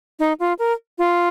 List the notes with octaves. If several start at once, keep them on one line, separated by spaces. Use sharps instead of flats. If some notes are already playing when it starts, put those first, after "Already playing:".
D#4
F4
A#4
F4